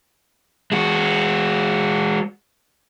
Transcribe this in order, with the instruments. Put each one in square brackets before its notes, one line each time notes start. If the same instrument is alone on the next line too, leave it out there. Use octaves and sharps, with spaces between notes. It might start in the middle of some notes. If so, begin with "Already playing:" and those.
[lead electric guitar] G#3 F#4